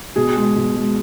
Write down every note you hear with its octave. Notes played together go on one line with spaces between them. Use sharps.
B2 G#4
G#3
B2
G#3